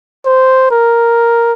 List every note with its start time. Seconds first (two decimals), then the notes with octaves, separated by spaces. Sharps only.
0.25 C5
0.71 A#4